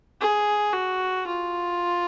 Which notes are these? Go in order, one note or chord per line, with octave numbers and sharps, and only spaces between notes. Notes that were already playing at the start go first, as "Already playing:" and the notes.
G#4
F#4
F4